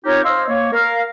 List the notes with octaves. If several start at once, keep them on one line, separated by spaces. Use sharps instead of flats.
C4 D#4 F4 G4 A#4 C#5
C5 D#5 F5 C6 E6
A#3 C#5
A#4 F5